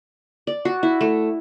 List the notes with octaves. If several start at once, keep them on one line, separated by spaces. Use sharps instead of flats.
D5
F#4
E4
A3